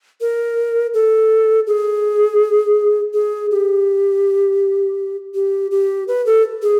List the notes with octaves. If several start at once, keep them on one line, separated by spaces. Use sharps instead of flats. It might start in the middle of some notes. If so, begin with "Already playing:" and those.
A#4
A4
G#4
G#4
G4
G4
G4
B4
A4
G#4